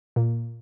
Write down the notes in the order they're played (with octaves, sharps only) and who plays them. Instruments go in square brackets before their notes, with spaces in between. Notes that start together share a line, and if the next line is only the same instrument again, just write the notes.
[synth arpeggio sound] A#2